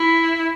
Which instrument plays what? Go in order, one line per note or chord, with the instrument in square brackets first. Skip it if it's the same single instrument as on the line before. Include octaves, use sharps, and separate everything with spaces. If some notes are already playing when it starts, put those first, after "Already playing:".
Already playing: [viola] E4